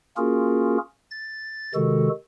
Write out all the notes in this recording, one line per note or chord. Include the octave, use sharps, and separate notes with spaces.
A#3 C#4 F4 F#4 G#4 A#4
A6
C3 D#3 G#3 F#4 A4